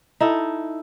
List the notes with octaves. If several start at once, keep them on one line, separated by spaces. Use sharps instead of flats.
D#4 E4 A4